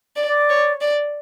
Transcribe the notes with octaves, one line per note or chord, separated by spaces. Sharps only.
D5
D5
C#5
D5